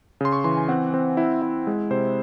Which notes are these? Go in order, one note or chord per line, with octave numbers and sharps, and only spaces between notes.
C#3 C6
C#6
E3 C6
G#5
C4 F#5
C4
E4
E4
G#3
C3 C5